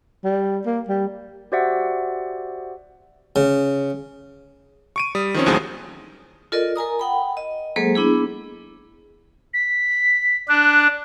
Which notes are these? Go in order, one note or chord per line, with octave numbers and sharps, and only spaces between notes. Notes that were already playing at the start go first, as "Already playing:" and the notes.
G3
A#3
G3
F#4 G4 C5 D5 E5 F#5
C#3
C#6 D7 D#7
G3 D#6
D#3 F3 C4 C#4
A1 D#2 A2 F#3 G#4 C5
F4 A4 A#4 D5 D#5
A#4 G#5 A#5 D#6
F#5 G5 B5
D#5
F#3 G#3 A#3 G#4 A4 C5
B3 D4 E4 G#4
B6
D4 F#6